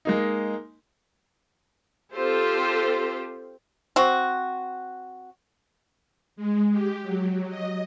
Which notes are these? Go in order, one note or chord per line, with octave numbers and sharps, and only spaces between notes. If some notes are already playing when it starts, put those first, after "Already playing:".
G#3 A#3 D#4
C4 F4 G4 A4 C5
C4 F#4
G#3
G4
F#3
D#5